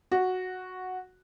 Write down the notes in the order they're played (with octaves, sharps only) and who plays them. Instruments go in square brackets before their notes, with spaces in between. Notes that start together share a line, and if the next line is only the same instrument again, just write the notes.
[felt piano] F#4